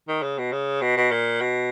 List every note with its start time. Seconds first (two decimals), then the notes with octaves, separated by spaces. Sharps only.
0.08 D#3
0.22 C#3
0.38 B2
0.52 C#3
0.82 B2
0.97 B2
1.11 A#2
1.41 B2